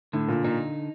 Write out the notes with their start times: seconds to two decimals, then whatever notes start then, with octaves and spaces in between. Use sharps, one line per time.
0.13 A2 D3
0.28 A#2
0.44 A#2 D#4